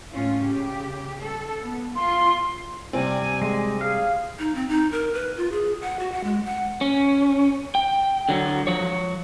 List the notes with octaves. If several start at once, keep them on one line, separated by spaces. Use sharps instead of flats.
A2 C#4 F4
C#3 G4
A4
B3
F4 C6
G2 C3 G3 C4 G#5
G#3
G#4 F5
D#4
C4
D#4
A#4
B4
F4
G#4
F#5
F#4
F#5
G#3
F#5
C#4
G5
D3 F#3
F3 C#5